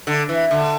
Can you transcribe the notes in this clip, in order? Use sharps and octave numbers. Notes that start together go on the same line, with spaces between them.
D3
E3
D3